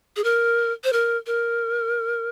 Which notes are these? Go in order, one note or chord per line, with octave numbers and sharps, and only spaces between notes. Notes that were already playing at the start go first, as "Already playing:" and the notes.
G#4
A#4
C5
A#4
A#4